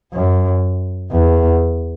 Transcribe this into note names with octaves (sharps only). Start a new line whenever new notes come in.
F#2
E2